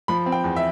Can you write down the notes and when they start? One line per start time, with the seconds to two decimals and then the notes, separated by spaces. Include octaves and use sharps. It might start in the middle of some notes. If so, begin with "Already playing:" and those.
0.08 F3 B5
0.26 C4
0.32 G5
0.44 E2
0.56 E5